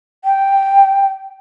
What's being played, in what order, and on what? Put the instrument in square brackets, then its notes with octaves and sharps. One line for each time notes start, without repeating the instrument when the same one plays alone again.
[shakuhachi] G5